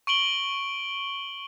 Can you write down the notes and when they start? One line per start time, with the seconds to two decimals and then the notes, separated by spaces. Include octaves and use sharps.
0.07 C#6 D7 F#7 G7